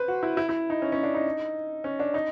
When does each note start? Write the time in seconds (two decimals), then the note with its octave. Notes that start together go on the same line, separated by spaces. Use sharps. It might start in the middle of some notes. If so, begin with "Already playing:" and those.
Already playing: B4 C5
0.08 F#4
0.23 E4
0.37 E4
0.49 E4
0.70 D#4
0.82 C#4
0.92 C#4
1.03 D4
1.14 D#4
1.84 C#4
1.99 D4
2.14 D#4